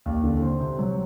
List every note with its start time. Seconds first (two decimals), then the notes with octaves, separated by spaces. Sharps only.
0.06 D#2
0.24 D3
0.42 C4
0.60 C3
0.79 F#3